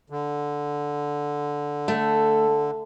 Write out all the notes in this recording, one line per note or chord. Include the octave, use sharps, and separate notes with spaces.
D3
A3